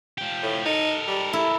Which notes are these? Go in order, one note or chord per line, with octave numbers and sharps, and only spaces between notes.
F3 G4
A2
D#4 A4 A#4
G3
A3 E4